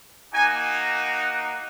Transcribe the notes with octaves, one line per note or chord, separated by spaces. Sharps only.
A#3 D#4 F#4 G#5